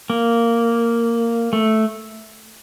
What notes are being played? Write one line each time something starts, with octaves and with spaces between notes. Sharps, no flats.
A#3
A3